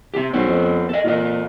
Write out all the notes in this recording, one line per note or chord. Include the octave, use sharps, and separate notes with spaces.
C4 G4
B1 B3 C5 C#5
F2
A4 D#5
A#2 F4 A4 D#5